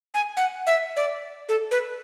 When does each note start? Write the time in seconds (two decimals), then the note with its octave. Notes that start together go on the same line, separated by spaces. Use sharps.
0.14 G#5
0.37 F#5
0.67 E5
0.96 D5
1.49 A4
1.71 B4